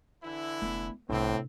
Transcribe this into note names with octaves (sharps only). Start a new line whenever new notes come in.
D3 E3 E4
F1 A3 B3
C2 A2 C3 B3 C4 D4